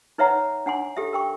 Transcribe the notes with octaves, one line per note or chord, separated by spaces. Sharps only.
D#4 B4 C#5 E5 F#5 A#5
D4 F#5 G#5 C6
G4 A4 E5
A#4 G5 C#6